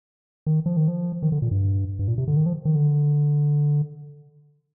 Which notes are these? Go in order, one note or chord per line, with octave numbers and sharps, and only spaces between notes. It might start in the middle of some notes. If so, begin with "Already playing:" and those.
D#3
F3
D#3
F3
D#3
D3
A#2
G2
G2
A#2
C3
D3
D#3
F3
D#3
D3